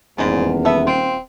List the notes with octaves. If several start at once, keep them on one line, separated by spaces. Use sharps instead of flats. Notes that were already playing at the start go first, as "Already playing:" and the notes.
D#1 E2 G#2 G#3 B3
B3 A4 E5
C4 F4